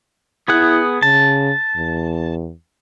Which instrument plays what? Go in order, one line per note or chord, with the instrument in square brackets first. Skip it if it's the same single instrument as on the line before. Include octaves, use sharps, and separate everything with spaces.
[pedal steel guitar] B3 G#4 F#5 [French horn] E4
[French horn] C#3 [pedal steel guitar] A5
[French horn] E2